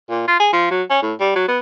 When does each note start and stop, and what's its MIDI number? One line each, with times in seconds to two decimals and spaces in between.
0.10 0.24 46
0.28 0.39 65
0.40 0.51 68
0.53 0.67 53
0.71 0.83 54
0.90 1.00 61
1.02 1.13 45
1.20 1.35 55
1.35 1.47 54
1.48 1.59 59